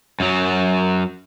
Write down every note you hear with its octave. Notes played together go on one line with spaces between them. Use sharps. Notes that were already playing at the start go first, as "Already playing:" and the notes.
F#2 F#3